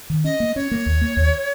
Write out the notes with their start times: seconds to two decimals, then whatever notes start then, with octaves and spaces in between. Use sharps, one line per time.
0.10 D#3
0.24 C#4 D#5
0.40 A#3
0.55 C#4 C#5
0.71 A#3
0.86 D#2
1.01 A#3
1.17 D#2